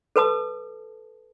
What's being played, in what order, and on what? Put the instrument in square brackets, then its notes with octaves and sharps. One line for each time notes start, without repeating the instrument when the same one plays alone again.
[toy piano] A4 B4 A5 D#6